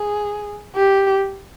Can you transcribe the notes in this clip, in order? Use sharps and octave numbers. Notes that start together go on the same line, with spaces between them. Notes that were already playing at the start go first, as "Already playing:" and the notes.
Already playing: G#4
G4